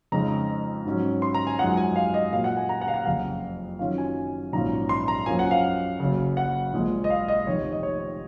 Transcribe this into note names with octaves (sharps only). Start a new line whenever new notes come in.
F2 C#3 G#3 D#4 A#5
G#2 F#3 C#4
C6
A#5
G#5
F#2 F3 G#3 D#4 F#5
G#5
F5
D#5
A#2 F#3 A#3 F5
F#5
G#5
A#5
F#5
F5
F#5
F#1 F2 C#3 F5
F#2 D#3 F#3 C#4 F4 F5
G#5
A#1 G#2 F#3 C#4 F4 A#5
C6
A#5
F#2 F3 A#3 C#4 G#5
F#5
F5
F#1 F#2 C#3
F#5
A#1 A#2 F3 G#3
D#5
F5
D#5
F1 F2 D#3 C#5
D#5
C#5